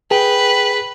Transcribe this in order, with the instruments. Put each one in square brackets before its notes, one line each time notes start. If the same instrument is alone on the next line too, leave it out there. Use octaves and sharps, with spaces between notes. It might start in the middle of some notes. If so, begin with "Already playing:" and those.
[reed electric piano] G#4 [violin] B4 [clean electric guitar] G5